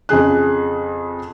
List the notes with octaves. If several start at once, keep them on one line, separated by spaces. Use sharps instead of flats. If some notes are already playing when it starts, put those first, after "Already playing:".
F2 C#3 G#4 F#6